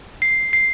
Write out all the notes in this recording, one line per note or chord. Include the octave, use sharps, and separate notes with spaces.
C7
C7